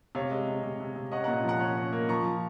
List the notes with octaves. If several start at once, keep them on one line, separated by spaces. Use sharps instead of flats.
C3 C#5 F5
G#3
C3
C3
C3
C3
C#4 D#5 F#5
A#2 F#5 A#5
F3 F#5 A#5
C#4
C#4
A#3
F3 A#5 C#6
F3